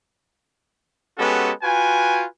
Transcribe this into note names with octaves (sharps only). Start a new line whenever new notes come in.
G#3 B3 C#4 F#4 G4 A4
F4 F#4 B4 G5 G#5